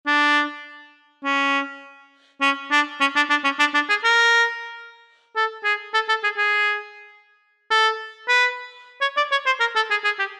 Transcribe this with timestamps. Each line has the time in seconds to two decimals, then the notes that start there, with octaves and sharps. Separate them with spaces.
0.07 D4
1.24 C#4
2.41 C#4
2.71 D4
3.00 C#4
3.16 D4
3.30 D4
3.44 C#4
3.59 D4
3.74 D4
3.89 G#4
4.04 A#4
5.36 A4
5.64 G#4
5.94 A4
6.09 A4
6.23 G#4
6.37 G#4
7.70 A4
8.28 B4
9.01 C#5
9.17 D5
9.31 C#5
9.46 C5
9.60 A#4
9.76 A4
9.90 G#4
10.04 G#4
10.19 G4